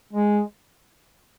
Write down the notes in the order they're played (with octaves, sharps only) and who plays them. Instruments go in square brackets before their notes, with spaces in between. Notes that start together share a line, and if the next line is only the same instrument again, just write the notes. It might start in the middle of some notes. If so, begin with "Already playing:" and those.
[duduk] G#3